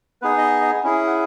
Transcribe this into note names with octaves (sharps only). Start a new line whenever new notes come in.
B3 D#4 G#4 B4
D#5
C#4 E4 G#4
F#5